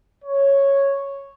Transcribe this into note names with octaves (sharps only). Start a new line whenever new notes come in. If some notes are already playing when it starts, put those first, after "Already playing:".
C#5